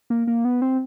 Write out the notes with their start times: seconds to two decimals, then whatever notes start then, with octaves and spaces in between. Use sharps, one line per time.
0.10 A#3
0.27 A#3
0.45 B3
0.62 C4